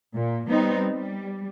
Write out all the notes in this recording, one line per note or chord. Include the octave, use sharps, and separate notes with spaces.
A#2
G3 B3 C4 D#4
G3